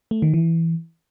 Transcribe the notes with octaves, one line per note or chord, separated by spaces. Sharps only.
A3
D#3
E3